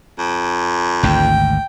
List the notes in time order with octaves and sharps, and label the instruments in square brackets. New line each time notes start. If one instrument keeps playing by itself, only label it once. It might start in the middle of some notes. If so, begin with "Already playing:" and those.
[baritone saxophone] F2
[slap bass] G#1 D2 G#2 [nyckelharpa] G5